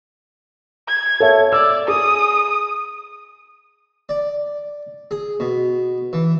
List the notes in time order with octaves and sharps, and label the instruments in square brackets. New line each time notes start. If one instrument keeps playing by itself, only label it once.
[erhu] G#6
[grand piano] A4 C#5 E5
[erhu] D5 [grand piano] E6
[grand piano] G#4 [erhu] D#6
[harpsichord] D5
G#4
B2
E3